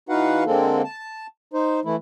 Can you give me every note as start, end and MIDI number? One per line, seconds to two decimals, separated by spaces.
0.09 0.44 52
0.09 0.44 63
0.09 0.44 66
0.09 0.44 71
0.09 0.44 77
0.09 0.44 78
0.46 0.82 50
0.46 0.82 56
0.46 0.82 58
0.46 0.82 60
0.46 0.82 69
0.84 1.27 81
1.54 1.80 63
1.54 1.80 72
1.85 1.96 52
1.85 1.96 57
1.85 1.96 64